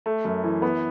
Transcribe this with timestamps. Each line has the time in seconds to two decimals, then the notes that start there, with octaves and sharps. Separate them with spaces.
0.06 A3
0.25 F#2
0.44 E3
0.62 B3